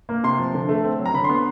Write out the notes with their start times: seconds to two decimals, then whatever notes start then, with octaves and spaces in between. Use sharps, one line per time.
0.09 A#3
0.24 C3 C6
0.39 F3
0.54 D3
0.69 A3
0.84 C4
0.99 F#3
1.06 A#5
1.14 D3 B5
1.24 C6
1.29 B3
1.35 C6